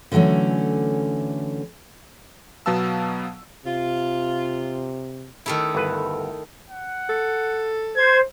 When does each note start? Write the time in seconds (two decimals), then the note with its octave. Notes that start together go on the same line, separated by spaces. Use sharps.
0.12 D3 E3 F#3 A3 C#4
2.66 B2 F#3 B3 F5 A5 E6
3.65 C3 F4
5.46 D#3 A3 E4
5.75 G1 B4
6.70 F#5
7.09 A4
7.97 C5 G#6